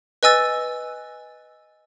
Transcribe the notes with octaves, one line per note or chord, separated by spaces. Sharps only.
B4 D#5 G#5 E6 A6